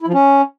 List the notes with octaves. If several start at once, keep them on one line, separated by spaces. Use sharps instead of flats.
E4
F3
C#4